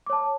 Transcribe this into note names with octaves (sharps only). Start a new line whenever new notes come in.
C#5 A5 D6